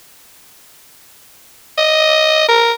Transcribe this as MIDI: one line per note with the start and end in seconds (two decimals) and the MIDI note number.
1.78 2.47 75
2.48 2.72 70